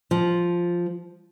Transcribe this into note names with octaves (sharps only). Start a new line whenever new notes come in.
F3